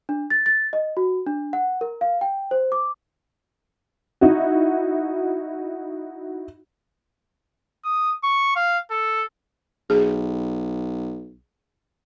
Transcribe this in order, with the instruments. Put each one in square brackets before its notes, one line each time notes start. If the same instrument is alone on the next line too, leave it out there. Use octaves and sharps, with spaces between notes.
[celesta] D4
A6
A6
D#5
F#4
D4
F#5
A#4
F5
G5
C5
D6
[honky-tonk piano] D#4 E4 F#4
[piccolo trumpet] D#6
C#6
F5
A4
[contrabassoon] B1 [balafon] G#4